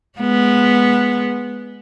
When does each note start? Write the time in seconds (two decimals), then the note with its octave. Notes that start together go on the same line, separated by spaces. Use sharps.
0.19 G#3 B3